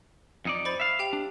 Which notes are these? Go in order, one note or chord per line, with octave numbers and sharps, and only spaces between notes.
F2 D#4 D5
C5 B5 A6
E5 F5
G4 G5 F7
D4